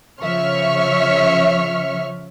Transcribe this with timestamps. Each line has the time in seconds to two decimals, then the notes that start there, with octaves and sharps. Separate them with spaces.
0.22 C#3 F3 C#5 E5 C#6 F6